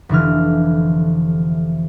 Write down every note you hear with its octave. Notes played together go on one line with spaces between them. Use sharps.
F1 D3 E3 F6